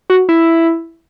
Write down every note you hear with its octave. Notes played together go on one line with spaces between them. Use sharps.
F#4
E4